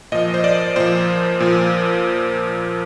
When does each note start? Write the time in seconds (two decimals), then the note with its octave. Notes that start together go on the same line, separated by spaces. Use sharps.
0.12 A#2 F3 D#5
0.34 C5
0.44 D5
0.76 A#2 F3 C5
1.40 A#2 F3